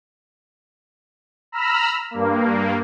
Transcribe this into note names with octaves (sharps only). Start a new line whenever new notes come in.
A#5 B5 E6 F6
G2 A#3